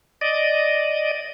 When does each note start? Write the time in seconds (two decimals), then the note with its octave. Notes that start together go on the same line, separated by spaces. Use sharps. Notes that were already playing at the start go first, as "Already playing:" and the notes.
0.21 D5 D#5